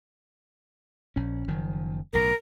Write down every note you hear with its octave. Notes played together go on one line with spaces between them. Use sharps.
A#1 C#4
F#1 D#3 F3
B1 A2 A#4